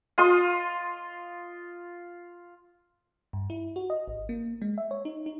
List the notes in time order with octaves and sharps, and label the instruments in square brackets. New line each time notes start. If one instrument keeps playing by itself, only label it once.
[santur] F4 C6 D#6
[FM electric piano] G2
E4
F#4
D#5
G#1
A#3
G#3
E5
C#5
D#4
D#4